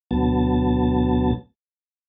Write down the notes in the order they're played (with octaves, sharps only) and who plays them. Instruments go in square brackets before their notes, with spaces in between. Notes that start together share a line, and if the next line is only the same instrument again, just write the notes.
[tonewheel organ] D2 B2 F#3 B3 A5